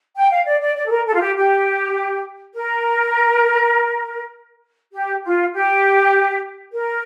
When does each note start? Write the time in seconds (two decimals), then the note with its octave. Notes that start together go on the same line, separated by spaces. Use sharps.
0.16 G5
0.31 F5
0.45 D5
0.61 D5
0.75 D5
0.86 A4
0.90 A#4
1.06 A4
1.14 F4
1.20 G4
1.36 G4
2.55 A#4
4.93 G4
5.24 F4
5.54 G4
6.72 A#4